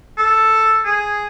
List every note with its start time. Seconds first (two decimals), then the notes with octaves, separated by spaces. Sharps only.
0.18 A4
0.85 G#4